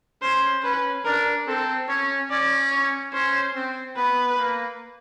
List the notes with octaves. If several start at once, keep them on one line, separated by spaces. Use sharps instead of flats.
C#4 C5
C#4 B4
D4 A#4
C4 A4
C#4 C#5
C#4 D5
C#5
C#4 C5
C4
B3 B4
A#3